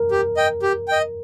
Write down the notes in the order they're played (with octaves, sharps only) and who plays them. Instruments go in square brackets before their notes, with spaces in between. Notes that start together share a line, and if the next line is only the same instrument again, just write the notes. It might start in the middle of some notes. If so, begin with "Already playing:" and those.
Already playing: [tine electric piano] A#4
[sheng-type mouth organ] G4
D#5 G5
G4
D#5 G5